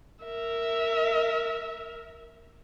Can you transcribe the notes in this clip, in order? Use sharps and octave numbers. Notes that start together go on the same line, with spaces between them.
A#4 E5